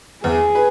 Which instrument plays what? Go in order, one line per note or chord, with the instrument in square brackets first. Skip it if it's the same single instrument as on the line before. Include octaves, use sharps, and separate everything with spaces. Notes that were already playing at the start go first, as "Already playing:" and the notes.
[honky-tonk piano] E2 [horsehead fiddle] G#4
[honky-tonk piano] B4